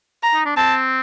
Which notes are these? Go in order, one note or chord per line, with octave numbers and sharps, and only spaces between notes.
A#5
D#4
D4
C4 A5